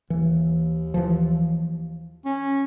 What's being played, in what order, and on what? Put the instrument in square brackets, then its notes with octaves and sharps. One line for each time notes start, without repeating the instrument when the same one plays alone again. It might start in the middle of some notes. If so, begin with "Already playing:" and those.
[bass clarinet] D#2 [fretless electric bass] E3
[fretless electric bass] E3 F3
[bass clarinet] C#4